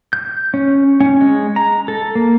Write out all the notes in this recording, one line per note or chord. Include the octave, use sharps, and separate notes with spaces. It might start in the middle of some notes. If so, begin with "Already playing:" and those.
G6
C#4
C#4
G#3
A#5
A4
A#3